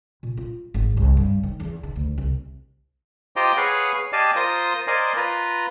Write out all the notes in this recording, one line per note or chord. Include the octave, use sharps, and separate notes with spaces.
A#2
F4
G#1
C2
G2
D#3
E2
D#3
D2
C2
F4 G4 C5 D#5 G5 A#5
G#4 B4 C#5 F5 F#5
G4 D5 D#5 F5 G#5 A5
F4 A#4 C5 D#6
A#4 C5 D5 D#5 F5 G#5
F4 B4 A#5